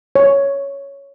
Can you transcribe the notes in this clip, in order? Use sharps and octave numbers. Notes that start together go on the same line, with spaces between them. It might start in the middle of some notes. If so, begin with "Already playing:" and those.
C#5